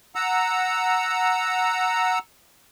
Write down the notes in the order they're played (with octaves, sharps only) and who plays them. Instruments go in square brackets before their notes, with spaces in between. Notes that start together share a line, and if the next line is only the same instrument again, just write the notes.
[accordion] F#5 A#5 E6